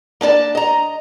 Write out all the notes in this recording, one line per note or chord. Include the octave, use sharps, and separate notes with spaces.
A#3 D4 D5 A5
D#5 A#5